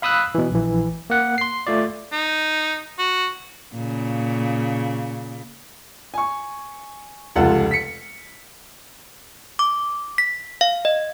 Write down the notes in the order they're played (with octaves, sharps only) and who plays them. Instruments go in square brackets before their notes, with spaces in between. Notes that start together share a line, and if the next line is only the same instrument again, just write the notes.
[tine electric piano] F5 B5 D#6 E6 F#6
B2 E3
A#1 E3
A#3 F#5
C6 C7
A3 F4 D5
[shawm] D#4
F#4
[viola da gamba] A#2 C#3
[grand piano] G#5 C#6
F1 C#2 F3 F4 A4 F#5
B6 C#7
[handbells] D6
B6
F5
D#5